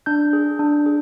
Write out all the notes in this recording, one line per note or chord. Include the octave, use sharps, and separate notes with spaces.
D4 G6
G#4
D4
G#4